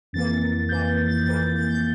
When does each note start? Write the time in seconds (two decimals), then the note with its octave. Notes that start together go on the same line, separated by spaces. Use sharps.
0.13 F2 E3 A#3 A6
0.69 F2 E3 A#3 G6
1.07 A6
1.25 F2 E3 A#3 A6
1.55 A6
1.68 G6